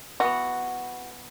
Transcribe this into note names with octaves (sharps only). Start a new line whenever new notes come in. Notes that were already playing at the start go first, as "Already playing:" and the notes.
E3 B3 F#4